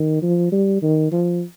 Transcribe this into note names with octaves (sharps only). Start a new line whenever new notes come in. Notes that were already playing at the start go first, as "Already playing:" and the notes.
Already playing: D#3
F3
G3
D#3
F3